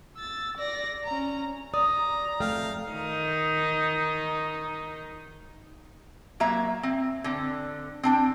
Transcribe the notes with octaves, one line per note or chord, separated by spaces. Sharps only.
E6 A6
D5 A#6
C#4 A#5
D5 A#5 D#6
F2 A3 F5 G5
D#3 D#4
F#3 A#3 E5 A#5
C4
D3 C4
C4 D4 G5